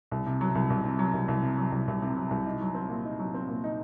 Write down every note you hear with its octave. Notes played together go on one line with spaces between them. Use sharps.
C2
C3
F#3
C2
C2
C3
F#3
C2
C2
C3
F#3
C2
C2
C3
F#3
C2
D#4
F#3
C4
A#2
D#4
F#3
C4
A#2
D#4